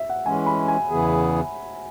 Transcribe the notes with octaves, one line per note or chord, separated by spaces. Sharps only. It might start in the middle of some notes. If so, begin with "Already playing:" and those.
Already playing: E5
F#5
E3 G#3 C#4 G#5
B5
G#5
E2 C#3 E3 B3 G#4